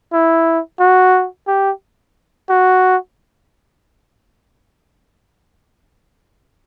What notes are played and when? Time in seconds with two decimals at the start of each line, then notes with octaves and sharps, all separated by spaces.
0.13 E4
0.80 F#4
1.48 G4
2.49 F#4